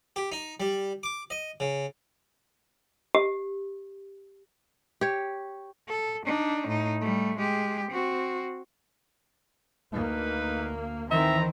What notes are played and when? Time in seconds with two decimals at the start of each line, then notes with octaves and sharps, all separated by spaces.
0.16 G4
0.32 D#4
0.60 G3
1.03 D6
1.30 D#5
1.60 C#3
3.15 G4
5.01 G4 C#5
5.88 A4
6.26 D4 D#4
6.68 A2 D#4
7.01 G3 A3
7.38 G#3 G4
7.91 C4 F#4
9.93 D2 A#3 D#4 B4
11.11 D#3 E3 C4 E5 A#5